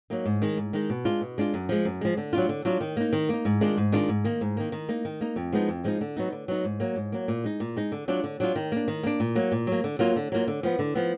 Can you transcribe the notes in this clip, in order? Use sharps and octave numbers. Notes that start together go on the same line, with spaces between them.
F#3 A#3 D#4
G#2
D#3 G#3 D#4
G#2
D#3 G#3 D#4
B2
G#3 D4 F4
B2
G#3 D4 F4
F#2
F3 G#3
F#2
F3 G#3
D3
F#3 D4 F4
D3
F#3 D4 F4
D#3
A#3 D#4
D#3
A#3 D#4
G#2
D#3 G#3 D4 F4
G#2
D#3 G#3 D4 F4
G#2
D#3 A#3
G#2
D#3 A#3
D#3
A#3 D#4
D#3
A#3 D#4
F2
F3 G#3 B3 D#4
F2
F3 G#3 B3 D#4
D3
F#3 B3 D#4
D3
F#3 B3 D#4
G#2
F#3 A#3
G#2
F#3 A#3
A#2
G#3 D#4
A#2
G#3 D#4
D3
F#3 D4 F4
D3
F#3 D4 F4
D#3
A#3 D4
D#3
A#3 D4
A#2
F#3 A#3
A#2
F#3 A#3
D3
F#3 A#3 F4
D3
F#3 A#3 F4
D3
F3 B3
D3
F3 B3